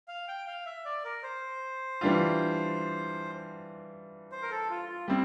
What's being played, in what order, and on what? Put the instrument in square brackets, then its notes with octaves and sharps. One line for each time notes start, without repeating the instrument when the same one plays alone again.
[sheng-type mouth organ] F5
G5
F5
E5
D5
A#4
C5
[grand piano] E3 G3 D4 F4
[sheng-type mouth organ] C5
A#4
A4
F4
F4
[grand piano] G3 C4 [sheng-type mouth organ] E4